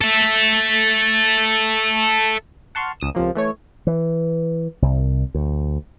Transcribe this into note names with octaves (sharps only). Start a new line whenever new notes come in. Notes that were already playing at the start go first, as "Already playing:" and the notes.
A4 E5
F#5 A5 C6 C#6 F6
C#2 D#6 E7
C#2 C3 F3 A#3
E3 A3 C#5
E3
C2
D2